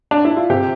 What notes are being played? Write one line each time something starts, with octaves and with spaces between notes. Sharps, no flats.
D4
E4
F4
C3 G4